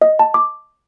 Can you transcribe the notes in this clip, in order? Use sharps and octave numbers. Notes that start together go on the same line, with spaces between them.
D#5
A5
D6